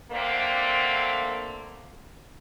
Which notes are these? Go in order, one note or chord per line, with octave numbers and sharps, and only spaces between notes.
D3 A3 A#3 C4